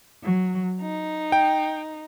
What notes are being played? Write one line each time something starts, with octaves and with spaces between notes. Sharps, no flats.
F#3
D#4
G5